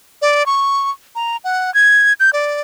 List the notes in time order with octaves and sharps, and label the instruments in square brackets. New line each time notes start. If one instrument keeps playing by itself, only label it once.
[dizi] D5
C#6
A#5
F#5
G#6
G6
D5